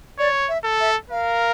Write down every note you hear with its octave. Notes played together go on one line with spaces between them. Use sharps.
C#5 D5
E5
A4
E5
A#4 F5